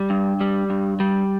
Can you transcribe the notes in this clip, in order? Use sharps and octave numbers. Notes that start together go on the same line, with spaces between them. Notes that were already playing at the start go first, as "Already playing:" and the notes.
Already playing: G3
G2
G3
G2
G3